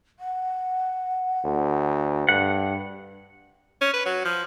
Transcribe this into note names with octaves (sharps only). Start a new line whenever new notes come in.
F#5
D2
G2 F#5
C#4
B4
F#3
F3